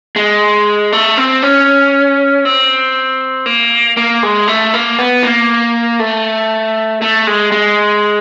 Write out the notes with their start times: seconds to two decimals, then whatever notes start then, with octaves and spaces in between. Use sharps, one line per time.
0.16 G#3
0.92 A3
1.17 C4
1.42 C#4
2.45 C4
3.46 A#3
3.97 A#3
4.23 G#3
4.48 A3
4.74 A#3
4.99 B3
5.23 A#3
5.99 A3
7.02 A3
7.27 G#3
7.52 G#3